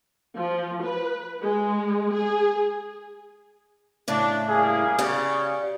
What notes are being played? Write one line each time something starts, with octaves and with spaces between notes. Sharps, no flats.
F3
B4
G#3
G#4
A2 C#3 D4 E4
G3 A#3 G#4
C#3 G4 D5 F#5